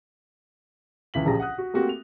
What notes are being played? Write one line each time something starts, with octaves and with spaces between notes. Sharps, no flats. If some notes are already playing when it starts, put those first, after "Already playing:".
C#2 E3 B6 F#7
A#1 C#3 G4 G#4 A#5 A#6
F#5 D#6 F#6
F#4
A3 A#3 C4 F#4 G4
F7